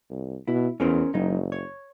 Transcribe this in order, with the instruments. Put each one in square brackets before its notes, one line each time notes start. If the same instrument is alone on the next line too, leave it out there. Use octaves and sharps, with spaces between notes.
[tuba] C2
[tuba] B2 [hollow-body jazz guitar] E4
[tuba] E2 [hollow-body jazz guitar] C#4 A#4 C5
[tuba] F#1 [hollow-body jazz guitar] F#3 D#4
[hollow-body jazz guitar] C#5